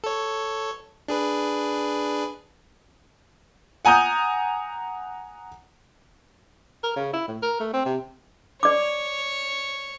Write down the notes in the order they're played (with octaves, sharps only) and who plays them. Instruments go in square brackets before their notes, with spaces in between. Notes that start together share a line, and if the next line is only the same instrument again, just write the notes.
[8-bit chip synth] A4 C#5
D4 G#4 B4
[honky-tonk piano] F#5 G#5 A#5 D#6 G6
[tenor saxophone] A#4
C#3
E4
A2
A#4
A3
C4
C3
[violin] C#5 [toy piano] D5 D6